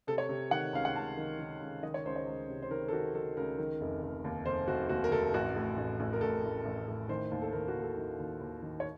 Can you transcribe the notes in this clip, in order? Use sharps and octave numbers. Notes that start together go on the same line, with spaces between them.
C3 A4
C#5
C3
D#3 F#5
C#2 F5
F#5
C#2 A5
D#3
D#3
C#2
D#3 D#5
C#5
C#2 C5
C#5
C#2
C3
C5
D#3 A#4
A4
D#3 F#4
D#3 A4
C#2 A#4
D#3
F1
F1
D#2
F1 C5
F1 F#4
D#2 F#4
A#4
F1 A4
A1 F#4
A2
A1
A1
A#4
A1 A4
A1
A1
A2
D#3 C5
D#2
A4
D#2 A#4
F#4
D#2
A4
D#3
D#2
D#2
D#3
C#5